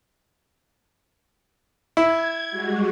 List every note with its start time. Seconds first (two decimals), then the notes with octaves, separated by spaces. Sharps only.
1.97 E4 G#6
2.50 G3 G#3 F#4